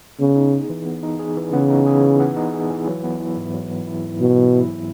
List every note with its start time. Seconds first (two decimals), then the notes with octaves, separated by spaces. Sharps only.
0.20 C#3 B3
0.36 D#4
0.53 G#4
0.70 E3
0.86 B3
1.03 D#4
1.19 G#4
1.37 E3
1.53 C#3 B3
1.70 D#4
1.87 G#4
2.03 E3
2.20 B3
2.36 D#4
2.53 G#4
2.70 E3
2.87 F#3
3.04 B3
3.20 E4
3.37 G#2
3.54 F#3
3.71 B3
3.87 E4
4.03 G#2
4.21 B2 F#3
4.37 B3
4.54 E4